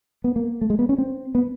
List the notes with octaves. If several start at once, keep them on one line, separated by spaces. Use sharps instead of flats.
B3
A#3
A3
G#3
B3
C#4
C4
B3